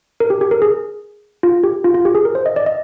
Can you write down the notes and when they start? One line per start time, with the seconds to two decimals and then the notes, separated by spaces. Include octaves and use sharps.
0.20 A#4
0.30 G4
0.41 G4
0.51 A#4
0.62 G#4
1.43 F4
1.64 G4
1.84 F4
1.95 F4
2.05 G4
2.15 G#4
2.25 A#4
2.35 C5
2.46 D#5
2.56 D5
2.66 D#5